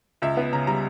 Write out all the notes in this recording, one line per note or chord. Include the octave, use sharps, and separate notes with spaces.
C#2 E5
B3
C#3 A#5
G3 A#5